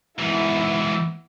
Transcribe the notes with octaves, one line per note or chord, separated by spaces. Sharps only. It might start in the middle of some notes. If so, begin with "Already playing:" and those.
G#2 E3 B3 E4